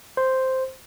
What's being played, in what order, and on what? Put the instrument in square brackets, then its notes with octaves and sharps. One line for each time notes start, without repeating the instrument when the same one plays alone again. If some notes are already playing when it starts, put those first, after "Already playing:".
[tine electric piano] C5